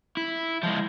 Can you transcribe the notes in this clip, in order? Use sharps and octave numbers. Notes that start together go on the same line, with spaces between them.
E4
F3 G#3